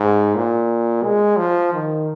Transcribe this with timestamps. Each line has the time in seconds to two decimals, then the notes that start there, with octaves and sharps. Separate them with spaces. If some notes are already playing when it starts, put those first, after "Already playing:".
Already playing: G#2
0.35 A#2
1.04 G#3
1.37 F3
1.73 D#3